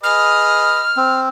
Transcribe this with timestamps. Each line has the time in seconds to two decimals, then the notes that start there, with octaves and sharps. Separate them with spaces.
0.03 G#4 B4 D#5 F6
0.96 C4